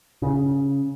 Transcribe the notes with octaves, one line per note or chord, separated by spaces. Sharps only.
C#3